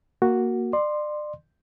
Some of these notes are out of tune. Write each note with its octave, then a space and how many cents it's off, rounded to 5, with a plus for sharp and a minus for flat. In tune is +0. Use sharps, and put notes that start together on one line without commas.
A#3 +0 F#4 +0
D5 +35 C6 +0